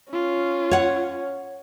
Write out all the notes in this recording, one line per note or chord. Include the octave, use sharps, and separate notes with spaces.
C#4 F4
C#5 F#5